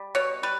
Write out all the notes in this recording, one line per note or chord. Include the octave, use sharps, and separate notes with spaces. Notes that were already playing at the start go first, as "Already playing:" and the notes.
Already playing: G3
B2 C#5
G3 B4